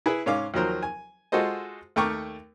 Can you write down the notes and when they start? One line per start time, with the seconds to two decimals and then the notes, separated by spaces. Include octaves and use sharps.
0.06 E4 G#4 B4
0.26 G#2 C#4 F5 D6
0.54 D#2 F3 F#3 A#4 C5
0.83 G#5
1.32 G#3 F4 F#4 A4 C5 D#5
1.96 D#2 A3 A#4 G5 C#6 D6